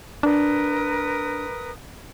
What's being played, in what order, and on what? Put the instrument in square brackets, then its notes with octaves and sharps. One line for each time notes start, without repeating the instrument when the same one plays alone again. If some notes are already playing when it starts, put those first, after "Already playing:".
[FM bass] D4 [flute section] A#4 B4 D#6